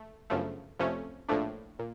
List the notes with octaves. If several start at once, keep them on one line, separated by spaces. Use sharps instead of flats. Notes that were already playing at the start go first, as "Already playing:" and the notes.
Already playing: A3
G1 F#2 C#3 F3 A3
F2 C3 F3 A3 C#4
A#1 A2 F3 A3 D4
A#2